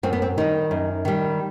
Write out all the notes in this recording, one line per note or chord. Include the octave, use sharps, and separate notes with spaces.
F#2 C4
B3
C4
D#3 G3 D#4
F#2
D#3 G3